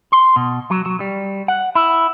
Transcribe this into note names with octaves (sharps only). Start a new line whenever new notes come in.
C6
B2
F#3
F#3
G3
F#5
E4